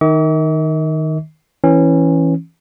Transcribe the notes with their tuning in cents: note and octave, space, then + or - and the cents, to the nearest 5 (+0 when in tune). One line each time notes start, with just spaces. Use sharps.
D#3 +0 D#5 +45 D6 -45
E3 -10 C#4 -20